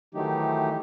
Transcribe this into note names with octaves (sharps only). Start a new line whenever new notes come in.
D#3 E3 F#3 A3 D#4 G4